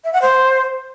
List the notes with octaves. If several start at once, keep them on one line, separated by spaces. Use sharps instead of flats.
E5
F#5
C5